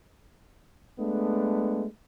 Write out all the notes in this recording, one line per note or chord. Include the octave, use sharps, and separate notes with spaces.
G#3 A3 B3 D4